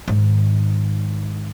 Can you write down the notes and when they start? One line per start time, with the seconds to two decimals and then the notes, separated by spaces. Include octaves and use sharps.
0.08 G#2 D#3